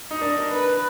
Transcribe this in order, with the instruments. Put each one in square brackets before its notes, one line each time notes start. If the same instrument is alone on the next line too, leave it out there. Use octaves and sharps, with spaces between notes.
[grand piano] D#4
[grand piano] D4 [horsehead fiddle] A#4
[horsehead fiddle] B4